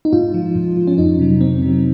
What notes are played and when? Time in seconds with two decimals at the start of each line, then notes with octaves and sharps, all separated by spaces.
0.05 D#4
0.13 G#2 F4
0.34 F3
0.56 G#2
0.77 F3
0.87 C#4
0.98 F2 D#4
1.19 C3 F#3
1.41 F2 C4
1.62 C3 F#3